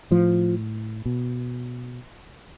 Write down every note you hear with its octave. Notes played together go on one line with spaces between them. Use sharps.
A2 F3
B2